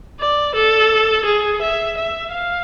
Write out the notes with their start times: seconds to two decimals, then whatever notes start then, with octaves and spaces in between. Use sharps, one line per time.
0.20 D5
0.55 A4
1.25 G#4
1.62 E5
1.97 E5
2.32 F5